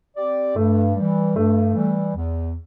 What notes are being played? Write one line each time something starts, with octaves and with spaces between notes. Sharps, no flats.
C4 G4 D5
G2 A3
E3 G3
G2 A3
E3 G3
E2